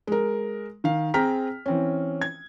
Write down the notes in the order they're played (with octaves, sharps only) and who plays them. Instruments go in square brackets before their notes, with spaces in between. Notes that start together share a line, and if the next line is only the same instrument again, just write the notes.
[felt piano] G#3 A#4
D#3 F5
C4 G#4 G5 A#5 F6 B6
E3 C4 C#4
G#6